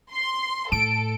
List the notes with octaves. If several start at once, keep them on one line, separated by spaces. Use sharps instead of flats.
C6
A2 A4 D7